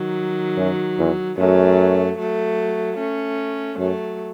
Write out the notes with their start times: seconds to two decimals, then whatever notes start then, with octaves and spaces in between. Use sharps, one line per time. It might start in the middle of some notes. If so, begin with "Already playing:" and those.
Already playing: D#3 F#3
0.57 F#2
0.98 E2
1.37 F#2 F#3 A3
2.18 F#3 A3
2.98 A3 C#4
3.78 F#2 F#3 A3